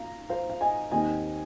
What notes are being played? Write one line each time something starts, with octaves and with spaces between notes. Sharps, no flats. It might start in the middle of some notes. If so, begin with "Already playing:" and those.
Already playing: F5 A#5
C5 F5
F5
D#5 G#5
D#2 D#3 C4 D#5 G#5